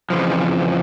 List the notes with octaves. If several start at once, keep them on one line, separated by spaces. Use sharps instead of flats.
F2 C#3 E3 F3